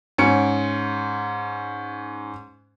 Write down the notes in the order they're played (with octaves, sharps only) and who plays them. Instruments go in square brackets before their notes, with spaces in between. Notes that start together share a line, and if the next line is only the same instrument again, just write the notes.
[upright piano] G#2 C#4 C#7 D7